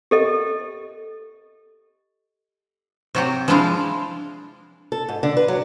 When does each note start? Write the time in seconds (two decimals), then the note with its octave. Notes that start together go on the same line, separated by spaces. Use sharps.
0.11 G4 A4 D#5
3.15 C3 F#3 G4
3.48 F3 G#3 D4 E4 F5
4.92 A4
5.09 G#2
5.23 D3
5.37 B4
5.48 F#3